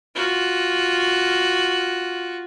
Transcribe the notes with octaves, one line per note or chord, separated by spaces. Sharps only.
F4 F#4